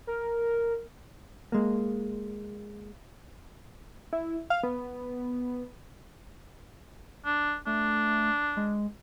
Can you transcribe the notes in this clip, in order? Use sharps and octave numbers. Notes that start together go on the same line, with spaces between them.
A#4
G#3 A#3
E4
F5
B3
D4
A3 D4
G#3